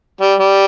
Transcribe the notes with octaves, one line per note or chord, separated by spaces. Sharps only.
G3
G3